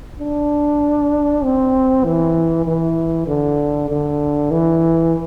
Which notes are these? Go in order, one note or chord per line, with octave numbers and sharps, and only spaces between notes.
D4
C4
E3
E3
D3
D3
E3